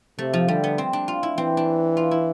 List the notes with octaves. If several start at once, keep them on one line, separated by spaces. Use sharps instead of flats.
C3 A3
F3
D3 G3
B3
C4
D4
F4
E4
E3 C4
D4
F4
E4